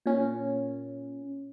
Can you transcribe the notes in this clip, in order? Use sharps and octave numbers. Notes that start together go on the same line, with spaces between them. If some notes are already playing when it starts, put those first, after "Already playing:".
A#2 C#4